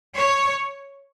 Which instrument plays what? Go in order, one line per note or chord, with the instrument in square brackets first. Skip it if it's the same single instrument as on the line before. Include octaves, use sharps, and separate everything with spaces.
[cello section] C#5